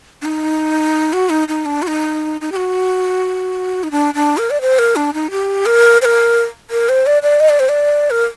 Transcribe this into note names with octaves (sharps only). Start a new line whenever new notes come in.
D4
D#4
F#4
D#4
D#4
D4
F#4
D#4
D#4
G4
F#4
D#4
D4
D4
A#4
D5
C5
A#4
D4
D#4
G4
A#4
C5
A#4
A#4
C5
D5
D5
D#5
D5
C5
D5
A#4